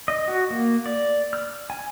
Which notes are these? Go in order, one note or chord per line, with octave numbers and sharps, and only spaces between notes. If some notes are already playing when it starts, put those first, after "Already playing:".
D#5
F#4
A#3
D5
F6
G#5